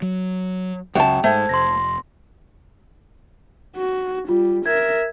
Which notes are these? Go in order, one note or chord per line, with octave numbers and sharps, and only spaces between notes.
F#3
C#2 F#2 C#3 G5 A5
G#2 A3 C5 G#6
F1 C6 A#6
F#4
G3 F4
A#4 E5 G#6